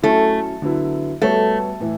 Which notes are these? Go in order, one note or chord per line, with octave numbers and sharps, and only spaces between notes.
F#3 A3 C#4 E4
D3 F#3 B3 E4
G3 A3 B3 F#4 C#5
A2 E3